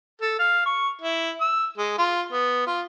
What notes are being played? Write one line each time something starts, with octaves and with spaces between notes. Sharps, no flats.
A4
F5
C#6
E4
E6
G#3
F4
B3
F4